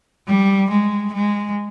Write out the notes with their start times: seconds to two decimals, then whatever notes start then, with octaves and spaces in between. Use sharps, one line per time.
0.27 G3
0.70 G#3
1.13 G#3